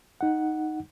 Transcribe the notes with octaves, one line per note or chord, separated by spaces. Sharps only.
D#4 F#5